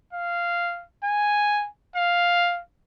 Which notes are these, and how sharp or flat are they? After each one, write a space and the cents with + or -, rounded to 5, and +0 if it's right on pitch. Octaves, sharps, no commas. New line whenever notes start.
F5 -10
G#5 +0
F5 +5